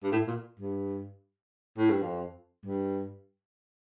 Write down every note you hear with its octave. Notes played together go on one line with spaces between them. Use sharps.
G2
A2
A#2
G2
A2
G2
F2
G2